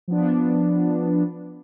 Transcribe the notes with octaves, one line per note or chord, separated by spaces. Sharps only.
F3 B3 D4